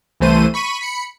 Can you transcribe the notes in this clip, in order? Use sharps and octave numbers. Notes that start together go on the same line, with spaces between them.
C2 E3 A3 C5 D#7
B5 C#6 B6 D#7
B5 C#7